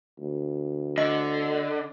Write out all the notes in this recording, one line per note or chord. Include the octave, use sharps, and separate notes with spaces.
D2
D3 D#5